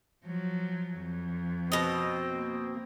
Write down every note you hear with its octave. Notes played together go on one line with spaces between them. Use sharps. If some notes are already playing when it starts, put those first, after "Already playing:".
F3 F#3
F2
B2 C4 D#5
A#3